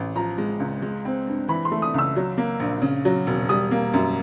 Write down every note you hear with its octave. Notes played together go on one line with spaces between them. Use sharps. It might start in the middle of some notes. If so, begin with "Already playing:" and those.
Already playing: A1
F3 A#5
G#3
C#2
G#3
C4
G2
E3 B5
C6
A3
D#6
C#2 E6
F#3
A#3
A#1
C#3
F#3
E1
G3 D#6
A#3
F#2